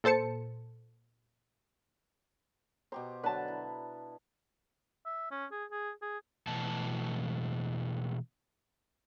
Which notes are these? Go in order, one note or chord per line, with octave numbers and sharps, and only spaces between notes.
A#2 A4 C5 A5 C#7
B2 G4 C5 A#5
D3 F#3 B4 A5
E4
E5
C#4
G#4
G#4
G#4
B2 E3 A3 A5